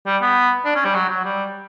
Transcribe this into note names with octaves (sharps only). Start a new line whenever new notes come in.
G3
B3
D4
C#4
G3
F#3
F#3
G3